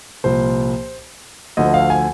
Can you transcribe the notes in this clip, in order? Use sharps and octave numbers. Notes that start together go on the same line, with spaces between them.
C2 A#2 F3 C5
D2 D3 F3 D#5
F5
G#5